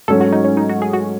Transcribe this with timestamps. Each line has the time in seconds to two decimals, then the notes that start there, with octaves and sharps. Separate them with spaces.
0.08 G#2 F#3 A3 C#4 A4
0.21 F#4
0.33 D#4
0.44 C#4
0.57 D#4
0.69 F#4
0.82 G#4
0.93 F#4